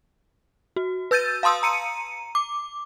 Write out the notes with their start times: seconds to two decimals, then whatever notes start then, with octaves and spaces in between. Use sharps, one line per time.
0.76 F#4
1.11 B4 E6 G6 A6 D#7
1.43 F5 A5 C6 D#6 E6
1.63 A#5 C#7 D#7
2.35 D6